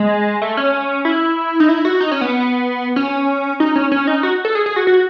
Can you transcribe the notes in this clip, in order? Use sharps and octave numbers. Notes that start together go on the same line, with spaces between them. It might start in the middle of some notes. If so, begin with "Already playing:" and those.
Already playing: G#3
A3
C#4
E4
D#4
E4
F#4
D#4
C#4
B3
C#4
D#4
C#4
C#4
D#4
F#4
A4
G#4
G#4
F#4
F#4